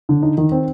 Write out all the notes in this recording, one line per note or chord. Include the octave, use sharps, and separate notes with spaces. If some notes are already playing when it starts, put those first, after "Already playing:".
D3
D#4
D#3
C4